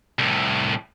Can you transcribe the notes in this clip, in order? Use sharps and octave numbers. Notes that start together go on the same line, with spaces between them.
C2 A2